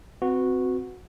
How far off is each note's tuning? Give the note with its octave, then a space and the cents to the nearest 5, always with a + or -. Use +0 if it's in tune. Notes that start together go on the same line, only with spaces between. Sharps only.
C4 -10 F#4 -10 B4 +20